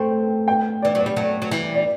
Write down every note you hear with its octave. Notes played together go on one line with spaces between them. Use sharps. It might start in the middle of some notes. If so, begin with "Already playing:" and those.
Already playing: A3 C4 G5
G5
E3 D5
F#3 D5
G3
F#3 A3
F#3
E3 G3
D5